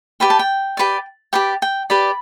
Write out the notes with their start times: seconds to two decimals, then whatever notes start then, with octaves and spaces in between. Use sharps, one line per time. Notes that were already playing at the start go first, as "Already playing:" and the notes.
0.20 G4 B4 D5 G5
0.30 A5
0.39 G5
0.77 G4 B4 D5
1.33 G4 B4 D5 G5
1.62 G5
1.90 G4 B4 D5 B5